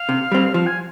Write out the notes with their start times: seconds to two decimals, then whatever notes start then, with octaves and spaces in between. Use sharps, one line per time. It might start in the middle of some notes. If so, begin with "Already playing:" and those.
Already playing: F5
0.09 C3
0.32 G3 C4
0.54 F3 F5
0.67 G#5